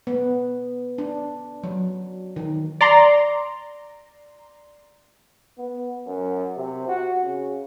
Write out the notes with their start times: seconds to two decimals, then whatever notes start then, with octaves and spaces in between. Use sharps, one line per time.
0.07 B3
0.98 D4
1.64 F#3
2.36 D#3
2.81 D5 A#5 C6
5.58 B3
6.07 F#2
6.57 C3
6.88 F#4
7.24 C#3